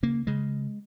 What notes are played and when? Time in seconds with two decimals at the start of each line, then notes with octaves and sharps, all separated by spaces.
0.03 C#3 A#3
0.27 C#3 G#3